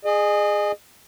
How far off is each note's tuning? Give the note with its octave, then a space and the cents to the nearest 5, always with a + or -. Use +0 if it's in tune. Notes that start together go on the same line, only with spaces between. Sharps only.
G#4 +0 D#5 -35